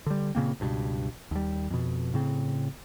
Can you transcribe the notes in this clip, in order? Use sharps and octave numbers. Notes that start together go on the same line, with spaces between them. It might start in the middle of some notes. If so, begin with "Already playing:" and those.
D3 G3
A#2 C#3 A#3 C4
C#2 G2 B2
D#2 G3
F2 B2
A2 C#3 C4